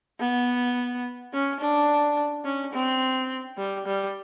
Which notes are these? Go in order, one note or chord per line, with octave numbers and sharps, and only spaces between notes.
B3
C#4
D4
C#4
C4
G3
G3